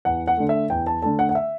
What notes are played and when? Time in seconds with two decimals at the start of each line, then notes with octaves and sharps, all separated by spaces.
0.05 E2 F#5
0.28 F#5
0.37 D3 A3
0.49 E5
0.70 E2 G5
0.87 A5
1.02 D3 A3 A5
1.19 F#5
1.29 F#5
1.35 E5